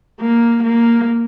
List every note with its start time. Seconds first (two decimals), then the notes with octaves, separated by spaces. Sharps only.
0.20 A#3
0.63 A#3